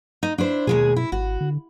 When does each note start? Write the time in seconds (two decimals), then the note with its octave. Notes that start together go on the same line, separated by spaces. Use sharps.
0.23 D#4
0.38 D4 E4 C5
0.67 D#2 B2 G#3 G#4
0.96 E4
1.12 G#1 F#4
1.41 D3